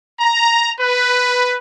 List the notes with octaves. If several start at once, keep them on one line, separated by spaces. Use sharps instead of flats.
A#5
B4